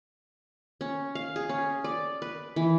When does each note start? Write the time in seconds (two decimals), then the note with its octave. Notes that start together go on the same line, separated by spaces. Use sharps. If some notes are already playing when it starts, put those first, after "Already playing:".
0.81 C#4
1.15 F5
1.36 G#4
1.49 C#4
1.84 D5
2.22 B4
2.56 E3